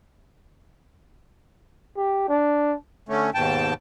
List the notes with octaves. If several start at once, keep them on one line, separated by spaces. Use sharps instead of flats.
G4
D4
D3 A3 C#4
D#2 G#2 B2 G5 A5